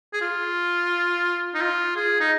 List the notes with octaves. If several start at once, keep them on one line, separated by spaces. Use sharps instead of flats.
G#4
F4
D#4
F4
G#4
D#4